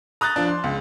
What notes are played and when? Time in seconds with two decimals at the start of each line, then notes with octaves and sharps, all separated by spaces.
0.21 A#5 D#6 F#6 G6 A6
0.36 F3 D4
0.48 C6
0.64 C#2